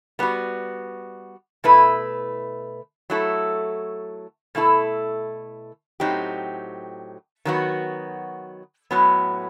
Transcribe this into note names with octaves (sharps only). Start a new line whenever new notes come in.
G3 B3 F#4
B2 A3 E4 B4
F#3 A3 E4 A4
B2 A3 E4 A4
A2 F#3 C4 D#4 G4
D#3 F#3 B3 F#4
A2 F#3 B3